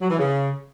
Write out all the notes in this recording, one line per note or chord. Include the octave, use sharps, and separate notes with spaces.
F#3
E3
C#3